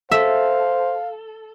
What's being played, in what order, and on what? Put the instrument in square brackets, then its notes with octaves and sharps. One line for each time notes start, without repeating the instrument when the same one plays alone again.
[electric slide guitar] A4 [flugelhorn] C5 [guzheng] E5 [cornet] F5